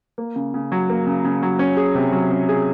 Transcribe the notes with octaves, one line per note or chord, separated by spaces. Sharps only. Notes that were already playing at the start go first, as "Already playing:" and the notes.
A#3
C#3
C#3
F#3
A#3
C#3
C#3
F#3
C#4
G#4
C3
F#3
C#4
G#4